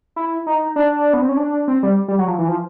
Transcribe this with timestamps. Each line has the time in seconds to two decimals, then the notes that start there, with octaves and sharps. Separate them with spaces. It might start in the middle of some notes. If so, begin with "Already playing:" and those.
0.16 E4
0.47 D#4
0.76 D4
1.13 B3
1.22 C4
1.29 C#4
1.37 D4
1.68 C4
1.83 G3
2.08 G3
2.19 F#3
2.28 F3
2.38 E3
2.48 F3